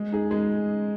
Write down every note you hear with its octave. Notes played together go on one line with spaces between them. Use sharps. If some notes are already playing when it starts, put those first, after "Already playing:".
Already playing: G#3
D#4 G#4
G#3